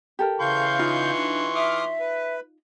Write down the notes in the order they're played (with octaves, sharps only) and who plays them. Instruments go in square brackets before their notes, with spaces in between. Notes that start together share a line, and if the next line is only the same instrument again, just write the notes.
[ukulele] G4 A4 A#4
[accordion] C#3 F5 G6 [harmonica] E3 C6 C#6
[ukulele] D#4 F4 D#5
[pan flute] D4
[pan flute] E5 [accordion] D6 D#6 F6
[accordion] B4